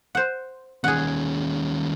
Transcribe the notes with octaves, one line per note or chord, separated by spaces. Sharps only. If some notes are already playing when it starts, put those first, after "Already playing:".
C5 F#5
D#2 C#4 G#4 F#5